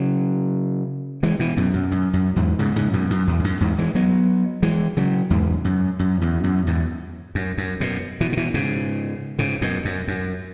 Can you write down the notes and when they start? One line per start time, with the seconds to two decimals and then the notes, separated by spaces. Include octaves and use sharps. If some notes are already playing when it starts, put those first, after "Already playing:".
Already playing: C#3 F#3
1.23 E3 G#3
1.39 B2 E3
1.57 F#2 B2
1.74 F#2
1.91 F#2
2.13 F#2
2.36 E2 G#2
2.59 G#2 C#3
2.76 G#2 C#3
2.93 F#2 B2
3.10 F#2
3.27 E2
3.39 G#2
3.44 F#2
3.60 E2 G#2
3.78 E3 G#3
3.95 F#3 B3
4.63 E3 G#3
4.97 C#3 F#3
5.30 E2 G#2
5.65 F#2
5.99 F#2
6.21 E2
6.44 F#2
6.67 E2 G#2
7.35 F#2
7.58 F#2
7.80 F#2 B2
8.21 B2 E3
8.32 C#3
8.37 B2 E3
8.54 G#2 C#3
9.39 G#2 C#3
9.61 F#2 B2
9.85 F#2
10.08 F#2